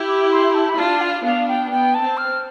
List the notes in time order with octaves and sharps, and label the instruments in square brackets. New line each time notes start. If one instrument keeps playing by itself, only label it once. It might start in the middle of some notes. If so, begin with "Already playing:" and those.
Already playing: [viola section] E4 G4
[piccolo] D6
C6
A5
B5
[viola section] D4 F4 [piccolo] A5
[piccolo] F5
[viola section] B3 D4 [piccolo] F5
[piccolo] G5
[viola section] B3 [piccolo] G5
[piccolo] A5
[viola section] C4
[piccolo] F6